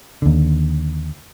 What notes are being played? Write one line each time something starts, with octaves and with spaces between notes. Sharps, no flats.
D#2 D3